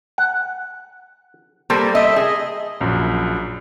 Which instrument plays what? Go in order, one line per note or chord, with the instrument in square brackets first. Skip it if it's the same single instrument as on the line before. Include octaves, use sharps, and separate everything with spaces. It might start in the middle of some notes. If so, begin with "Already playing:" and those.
[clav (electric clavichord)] F#5
[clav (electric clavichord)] G3 A4 C5 [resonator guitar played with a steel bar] A#3
[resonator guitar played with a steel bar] D#5 [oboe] E5
[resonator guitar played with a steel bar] G#4 [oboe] D#5
[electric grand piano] A#1 F#2